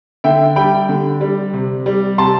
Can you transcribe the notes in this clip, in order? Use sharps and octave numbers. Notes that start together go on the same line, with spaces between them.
D3 E5 G5
G3 G5 B5
D3
G3
C3
G3
C3 A5 C6